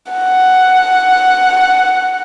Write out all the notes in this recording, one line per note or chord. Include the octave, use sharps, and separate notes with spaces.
F#5